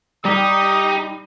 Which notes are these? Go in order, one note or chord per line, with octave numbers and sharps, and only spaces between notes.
G3 D#4 G4 D#6